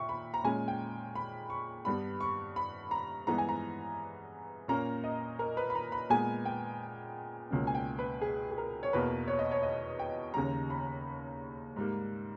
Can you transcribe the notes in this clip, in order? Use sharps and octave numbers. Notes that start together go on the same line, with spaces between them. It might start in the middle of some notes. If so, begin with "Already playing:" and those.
Already playing: A#2 E5 G5 C#6
B5
A#5
A#2 G#3 C#4 G#5
G5
B5
C#6
G2 G3 B3 B5
C#6
B5
A#5
G2 E3 G#3 B3 A#5
G#5
A#5
A#2 A#3 C#4 A#5
D#5
A#4
B4
B5
A#5
B5
A#2 G#3 B3 G#5
G5
C#2 B2 A#3 C#4
G#5
G5
B4
G#4
G#4
A#4
C#5
E2 B2 A#3 B4
C#5
D#5
C#5
D#5
G5
D#2 C#3 G3 A#5
B5
G#2 G3 A#3